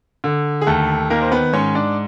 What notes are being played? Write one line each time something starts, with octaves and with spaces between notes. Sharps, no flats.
D3
G#4
D#2 A3 A4
D#3 A#3 A#4
C5
B3 B4
G#2 C#4 C#5
D4 D5